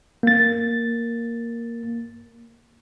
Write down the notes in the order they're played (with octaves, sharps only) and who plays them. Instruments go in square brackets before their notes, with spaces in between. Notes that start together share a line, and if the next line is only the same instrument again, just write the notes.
[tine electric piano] A#3 A6